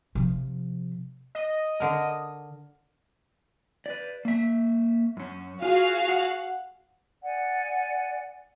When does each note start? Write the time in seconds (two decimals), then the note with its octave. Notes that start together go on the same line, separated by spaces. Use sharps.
0.15 C3 F3
1.35 D#5
1.80 D3 A#4
3.86 B4 D5
4.25 A#3 E5
5.17 F#2 C#4
5.62 F4 F#4 G#4 F5
6.09 F#5
7.23 D5 F#5 G#5